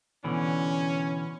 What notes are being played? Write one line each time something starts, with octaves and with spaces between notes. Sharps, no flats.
B2 D3 E3 C#4